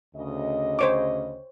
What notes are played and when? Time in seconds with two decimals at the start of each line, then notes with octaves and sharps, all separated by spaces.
0.16 D2 C#3 D#5
0.79 C5 C#5 D6